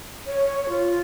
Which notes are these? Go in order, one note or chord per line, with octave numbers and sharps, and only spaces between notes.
C#5
F4